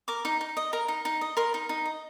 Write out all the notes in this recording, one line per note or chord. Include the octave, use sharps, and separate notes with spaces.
A#4 D6
D#4
D#4
D#5
A#4 A#5
D#4
D#4
D#5
A#4 C6
D#4
D#4
D#5